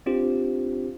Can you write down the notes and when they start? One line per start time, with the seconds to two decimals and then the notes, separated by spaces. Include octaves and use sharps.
0.06 C4 D4 F4 G4 C5